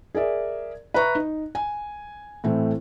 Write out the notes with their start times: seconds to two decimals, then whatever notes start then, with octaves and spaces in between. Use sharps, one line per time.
0.15 G#4 A#4 D5 E5
0.94 B4 E5 A#5 C#6
1.15 D#4
1.55 G#5
2.44 A2 E3 A3 C4